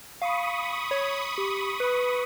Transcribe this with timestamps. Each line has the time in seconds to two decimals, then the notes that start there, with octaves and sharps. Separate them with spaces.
0.22 F5 B5 C#6 D#6
0.91 C#5
1.38 G4
1.80 B4